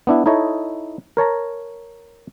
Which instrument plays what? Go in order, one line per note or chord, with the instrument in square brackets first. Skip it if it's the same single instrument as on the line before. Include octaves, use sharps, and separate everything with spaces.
[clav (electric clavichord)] B3 D4 E4
D#4 E4 A4 C#5 D#5
A#4 C#5 A5 A#5